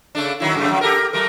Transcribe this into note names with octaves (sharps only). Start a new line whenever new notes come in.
C#3 A3 D4
D#3 F#3 E4
F#2 C#3 A3
F2 G#2 F#3
G4 A4 A#4
F#3 A3 A#4